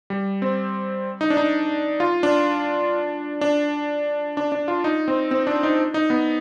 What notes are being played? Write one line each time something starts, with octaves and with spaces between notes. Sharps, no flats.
G3
C4
D#4
D4
D#4
F4
D4
D4
D4
D4
F4
D#4
C4
C4
D4
D#4
D#4
B3